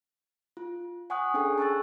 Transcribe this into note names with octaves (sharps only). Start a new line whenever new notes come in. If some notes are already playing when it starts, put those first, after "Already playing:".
F4
F#5 G#5 C#6 D#6 F#6
C#4 D4 G#4 A4 G5 G#5
A5 C#6 E6 F#6 A6